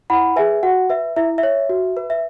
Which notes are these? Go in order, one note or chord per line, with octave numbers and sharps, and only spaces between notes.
E4 F#5 B5
G#4 B4 E5 G#5
F#4 F#5
B4 E5
E4 E5
E5
C#5
F#4
B4
E5